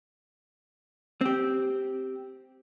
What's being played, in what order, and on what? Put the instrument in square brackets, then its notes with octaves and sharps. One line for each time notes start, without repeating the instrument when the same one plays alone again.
[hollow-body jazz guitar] C4 G4